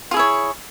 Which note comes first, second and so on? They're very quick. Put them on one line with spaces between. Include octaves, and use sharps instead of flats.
F4 G#4 E4 C#5